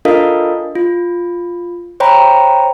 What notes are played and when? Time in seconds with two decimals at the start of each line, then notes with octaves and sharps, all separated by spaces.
0.05 D4 F4 A4 A#4 D#5 F5
0.75 F4
2.00 C5 C#5 G5 A#5 B5